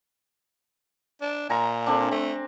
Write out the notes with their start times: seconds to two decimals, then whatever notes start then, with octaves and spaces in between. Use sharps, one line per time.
1.22 D4
1.50 A#2 G#5 A#5 C6
1.87 D3 C4 D4
2.11 A3 C4